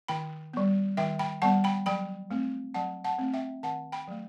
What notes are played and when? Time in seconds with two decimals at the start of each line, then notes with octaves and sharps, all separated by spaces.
0.08 D#3 G5 B5
0.53 G3 B3
0.97 D#3 E5 G5
1.19 G5 B5
1.42 G3 B3 F#5 A5
1.64 G5 B5
1.86 F#3 G5 B5
2.31 A3 C4
2.74 F#3 F#5 A5
3.04 F#5 A5
3.19 A3 C4
3.34 E5 G5
3.63 D#3 F#5 A5
3.92 G5 B5
4.08 F#3 A3